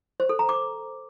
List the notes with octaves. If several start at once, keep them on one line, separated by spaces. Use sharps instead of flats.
C5
A4
A#5
D6